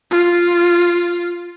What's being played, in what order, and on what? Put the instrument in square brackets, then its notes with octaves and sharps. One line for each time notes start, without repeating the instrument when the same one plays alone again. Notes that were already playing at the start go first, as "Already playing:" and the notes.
[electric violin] F4